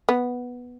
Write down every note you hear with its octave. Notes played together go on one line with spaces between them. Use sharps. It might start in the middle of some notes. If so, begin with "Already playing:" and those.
B3